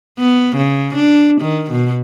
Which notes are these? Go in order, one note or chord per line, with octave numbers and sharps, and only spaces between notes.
B3
C#3
D4
D#3
B2